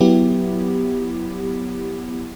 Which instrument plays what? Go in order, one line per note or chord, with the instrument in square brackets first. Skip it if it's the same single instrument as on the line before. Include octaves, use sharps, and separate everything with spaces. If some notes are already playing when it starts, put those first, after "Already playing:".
[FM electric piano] F#3 B3 E4 G4